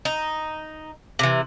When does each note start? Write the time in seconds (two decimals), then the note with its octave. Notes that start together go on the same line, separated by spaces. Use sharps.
0.05 D#4
1.19 C3 E3